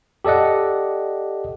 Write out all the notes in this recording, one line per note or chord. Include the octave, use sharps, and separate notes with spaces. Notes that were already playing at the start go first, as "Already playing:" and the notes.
G4 A4 D5 D#5 F#5